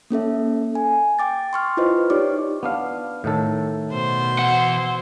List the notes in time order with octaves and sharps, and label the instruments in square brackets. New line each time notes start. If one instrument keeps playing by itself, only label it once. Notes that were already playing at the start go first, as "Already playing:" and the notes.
[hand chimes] A#3 C#4 A4 E5
G#5
G5 D6 A6
C6 C#6 F6
E4 F4 B4 C5 D#5
D#4 G4 C#5 D5 C#6 D6
[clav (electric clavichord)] B3 D4 F5
A2 D#3 A4
[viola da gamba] B2 C5
[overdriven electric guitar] E3 F#5